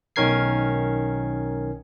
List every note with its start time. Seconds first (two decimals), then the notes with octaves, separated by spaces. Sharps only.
0.16 B1 D#3 C#4 A#4 G#6 C7